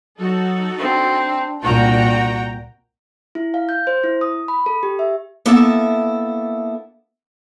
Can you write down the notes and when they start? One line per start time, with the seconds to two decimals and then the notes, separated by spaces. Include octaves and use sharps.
0.19 F#3 D#4 F#4 A4
0.78 C4 D4
1.63 C2 A#2 F#4 G5 A#5
3.35 E4
3.54 F5
3.69 G6
3.87 C5
4.04 E4
4.21 D#6
4.48 B5
4.66 A4
4.83 G4
4.99 E5
5.46 A#3 B3 D4 E4 A4 E5